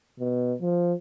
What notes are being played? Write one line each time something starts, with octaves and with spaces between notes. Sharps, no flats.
B2
F3